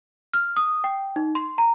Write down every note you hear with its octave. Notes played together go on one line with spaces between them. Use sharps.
F6
D#6
G5
D#4
C6
A#5